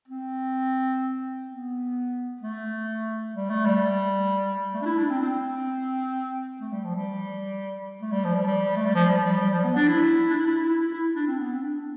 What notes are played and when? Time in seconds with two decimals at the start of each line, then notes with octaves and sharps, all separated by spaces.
0.08 C4
1.48 B3
2.41 A3
3.35 G3
3.50 A3
3.66 G3
4.74 A3
4.82 D4
4.86 E4
4.98 D4
5.10 C4
5.21 C4
6.60 A3
6.72 G3
6.85 F3
6.96 G3
8.01 A3
8.12 G3
8.24 F3
8.35 G3
8.47 G3
8.77 A3
8.86 G3
8.95 F3
9.10 G3
9.25 G3
9.41 G3
9.52 F3
9.64 B3
9.76 D4
9.88 E4
10.30 D4
10.34 E4
10.46 E4
10.58 E4
10.69 E4
10.81 E4
10.92 E4
11.15 D4
11.27 C4
11.39 B3
11.51 C4
11.62 D4